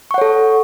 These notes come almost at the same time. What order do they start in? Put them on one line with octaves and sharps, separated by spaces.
C#6 F#5 C#5 A4